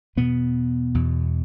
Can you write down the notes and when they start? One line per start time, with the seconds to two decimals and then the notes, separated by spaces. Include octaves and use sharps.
0.16 E2 B2 B3
0.94 E2 B2